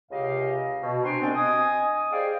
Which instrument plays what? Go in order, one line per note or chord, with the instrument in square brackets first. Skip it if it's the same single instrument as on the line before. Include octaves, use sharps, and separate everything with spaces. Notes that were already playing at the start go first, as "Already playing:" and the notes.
[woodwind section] C#2 C3 G4 D#5 F5
B2
C4 D4 G5 G#5 A#5 C6
C2 B2 B3 C4 D4
D#5 G#5 D#6
G4 G#4 C5 D5 D#5 F5